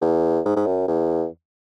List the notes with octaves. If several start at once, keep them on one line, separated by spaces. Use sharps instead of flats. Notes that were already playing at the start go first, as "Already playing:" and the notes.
E2
G#2
G#2
F#2
E2